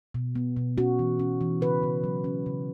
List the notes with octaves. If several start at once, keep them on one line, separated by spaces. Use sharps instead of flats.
B2
B3
B2
C#4 F#4
E3
C#4
E3
C#3 B4
C#3
F#3
C#4
C#3